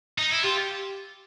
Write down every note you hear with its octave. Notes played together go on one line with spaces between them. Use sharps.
D#4
E4
F4 G4